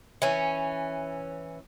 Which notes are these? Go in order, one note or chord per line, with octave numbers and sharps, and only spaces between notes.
E3 C#4